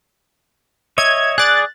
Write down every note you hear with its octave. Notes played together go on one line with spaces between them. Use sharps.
C#5 D#5 E5 G#6
G#4 D5 F#6 A6